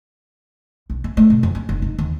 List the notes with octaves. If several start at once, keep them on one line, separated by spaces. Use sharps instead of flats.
B1
B3
A3
B2
F2
C#4
F1
D#4
D#2